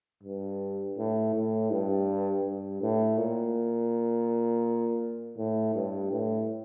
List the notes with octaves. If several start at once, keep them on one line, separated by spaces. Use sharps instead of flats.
G2
A2
A2
G2
G2
A2
A#2
A2
G2
A2